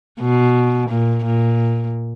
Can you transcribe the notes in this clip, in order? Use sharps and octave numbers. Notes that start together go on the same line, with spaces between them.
B2
A#2
A#2